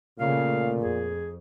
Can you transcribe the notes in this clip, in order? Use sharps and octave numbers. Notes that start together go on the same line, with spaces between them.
A#2 C#3 A3 F5
F2 G#4